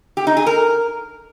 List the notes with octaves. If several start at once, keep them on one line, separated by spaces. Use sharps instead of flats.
G4
D#4
G#4
A#4